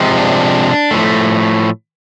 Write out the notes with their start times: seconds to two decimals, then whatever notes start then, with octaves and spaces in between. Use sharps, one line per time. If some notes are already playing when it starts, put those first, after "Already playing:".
Already playing: C3 F3 G#3
0.17 D4
0.91 A2 F3 A3